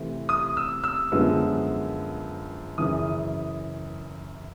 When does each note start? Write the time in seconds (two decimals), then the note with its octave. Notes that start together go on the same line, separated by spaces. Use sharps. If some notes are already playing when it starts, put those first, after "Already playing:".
Already playing: C3 E3 A3 C4
0.29 D#6
0.57 E6
0.84 E6
1.12 F#2 D3 F3 G#3 B3
2.78 F#2 C#3 E3 D#6